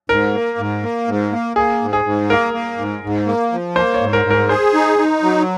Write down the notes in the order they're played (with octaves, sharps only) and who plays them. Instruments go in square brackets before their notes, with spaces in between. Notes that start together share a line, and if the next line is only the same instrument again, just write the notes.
[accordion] G#2 [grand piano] A#4
[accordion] A#3
G#2
A#3
G#2
A#3
[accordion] A#3 [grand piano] G#4
[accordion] G#2
[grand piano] G#4
[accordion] G#2
[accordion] A#3 [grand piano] A#4
[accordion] A#3
G#2
G#2
A#3
F3
[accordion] A#3 [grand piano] C5
[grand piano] C#5
[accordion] G#2
[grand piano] A#4
[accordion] G#2
[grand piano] A#4
[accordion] G#4 [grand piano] C5
[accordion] D#4
D#4
F#3